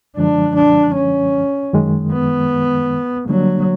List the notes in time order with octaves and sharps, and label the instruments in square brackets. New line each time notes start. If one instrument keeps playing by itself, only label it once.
[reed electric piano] F#2 D3 F3 G#3 [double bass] D4
[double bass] D4
C#4
[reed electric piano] F#2 D#3 G#3
[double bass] B3
[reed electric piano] D3 G3 A#3 D4 [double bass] F#3